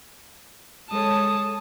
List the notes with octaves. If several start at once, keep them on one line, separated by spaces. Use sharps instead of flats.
G#3 A4 C#5 A5 D#6